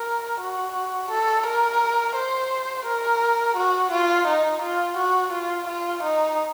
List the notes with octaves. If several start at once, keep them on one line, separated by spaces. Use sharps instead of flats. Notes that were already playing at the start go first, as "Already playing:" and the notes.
Already playing: A#4
F#4
A4
A#4
C5
A#4
F#4
F4
D#4
F4
F#4
F4
F4
D#4